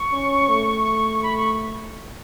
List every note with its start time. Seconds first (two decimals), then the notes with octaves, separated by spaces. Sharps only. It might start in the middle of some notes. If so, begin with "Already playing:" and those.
Already playing: C#6
0.13 C#4
0.49 A3
1.23 B5
1.37 C#6